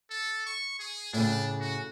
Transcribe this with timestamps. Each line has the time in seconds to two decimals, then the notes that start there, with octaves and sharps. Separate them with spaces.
0.10 A4
0.46 C#6
0.79 G#4
1.13 A2 C#3 D4
1.60 F#4